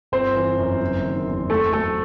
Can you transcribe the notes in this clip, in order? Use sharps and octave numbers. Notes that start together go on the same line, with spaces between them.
G1 C4 C5
E3
F#2
F#1
D#3
E2
A3 A4
F#3 A3 A4